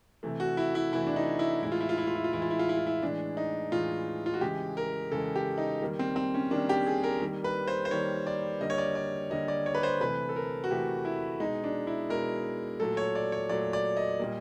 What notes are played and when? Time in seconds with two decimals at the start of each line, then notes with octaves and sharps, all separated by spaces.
0.23 C3 E3 A3
0.40 F#4
0.57 E4
0.75 E4
0.92 C3 E3 A3 E4
1.07 D4
1.16 D#4
1.39 E4
1.62 A2 E3 G#3 E4
1.72 F4
1.81 E4
1.89 F4
1.98 E4
2.07 F4
2.15 E4
2.24 F4
2.33 A2 E3 G#3 E4
2.42 F4
2.50 E4
2.59 F4
2.69 E4
2.77 F4
2.87 E4
3.02 A2 E3 G#3 D4
3.37 D#4
3.72 A2 E3 G#3 F4
4.26 F4
4.34 F#4
4.41 C#3 E3 G#3 G4
4.77 A#4
5.12 C#3 E3 G#3 A4
5.36 G4
5.58 D#4
5.82 D#3 G3 A#3
5.99 C4
6.16 C4
6.34 C#4
6.51 D#3 G3 A#3 D4
6.69 G4
6.87 G#4
7.03 A#4
7.21 D#3 G3 A#3
7.44 B4
7.68 C5
7.85 C5
7.91 D#3 G3 A#3 C#5
8.27 D5
8.61 D3 G3 A#3 D#5
8.70 C#5
8.78 D5
8.95 D5
9.30 D3 G3 A#3 D#5
9.48 D5
9.66 C#5
9.75 B4
9.83 C5
10.01 C3 E3 A3 B4
10.29 A4
10.36 A#4
10.64 F#4
10.71 C3 E3 A3 G4
11.05 E4
11.40 B2 G#3 D#4
11.64 D4
11.87 E4
12.09 B2 G#3 A#4
12.80 A#2 F#3 A3 A4
12.97 C#5
13.15 D5
13.32 C#5
13.49 A#2 F#3 A3 D5
13.73 D5
13.97 D#5
14.19 A#2 G3 A#3